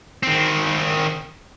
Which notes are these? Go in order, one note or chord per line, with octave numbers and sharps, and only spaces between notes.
D#3 C4